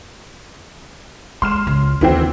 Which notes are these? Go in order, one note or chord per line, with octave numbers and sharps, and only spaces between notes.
G#3 C6 F6 E7
C#2
D#2 D3 E3 C4